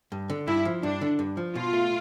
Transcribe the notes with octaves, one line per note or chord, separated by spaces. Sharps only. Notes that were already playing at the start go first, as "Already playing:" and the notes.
G2
D3
G2 E4
F3
G2 D4
D3
G2
F3
B2 F4
A3